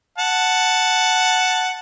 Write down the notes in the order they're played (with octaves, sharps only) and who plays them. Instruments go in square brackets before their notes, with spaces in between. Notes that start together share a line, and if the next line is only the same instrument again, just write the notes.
[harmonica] F#5 A5